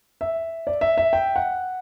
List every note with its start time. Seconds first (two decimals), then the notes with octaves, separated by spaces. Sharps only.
0.21 E5
0.67 D5
0.81 E5
0.98 E5
1.13 G5
1.36 F#5